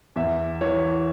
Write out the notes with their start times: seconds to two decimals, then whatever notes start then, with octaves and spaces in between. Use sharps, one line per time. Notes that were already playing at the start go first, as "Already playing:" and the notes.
0.16 E2 E5
0.61 E3 C#5